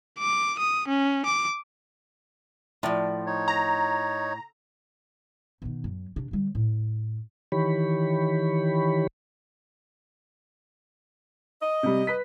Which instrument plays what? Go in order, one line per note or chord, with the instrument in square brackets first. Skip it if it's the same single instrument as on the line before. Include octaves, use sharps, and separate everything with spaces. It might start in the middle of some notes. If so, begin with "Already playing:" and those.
[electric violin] D6
D#6
C#4
D6
[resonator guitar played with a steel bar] A2 [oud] F3 F4 D5
[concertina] D#4 C#5
[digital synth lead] A#5
[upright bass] B2 D#3
F#2
C3 D4
D3 G3
A2
[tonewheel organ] D#3 E3 G4 C#5 B5
[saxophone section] D#5
[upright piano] C3 G3
B4 B6